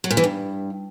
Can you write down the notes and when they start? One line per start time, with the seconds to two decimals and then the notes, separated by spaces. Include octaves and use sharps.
0.04 F#3
0.11 A#2
0.17 E3
0.24 G2